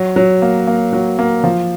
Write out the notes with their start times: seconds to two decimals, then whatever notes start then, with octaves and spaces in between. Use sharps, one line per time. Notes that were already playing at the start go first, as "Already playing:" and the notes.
Already playing: F#3
0.16 F#3
0.42 A#3
0.67 A#3
0.93 F#3
1.19 A#3
1.44 F3